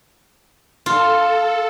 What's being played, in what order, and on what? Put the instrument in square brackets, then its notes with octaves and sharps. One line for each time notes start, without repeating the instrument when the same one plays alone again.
[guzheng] F4 [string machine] A4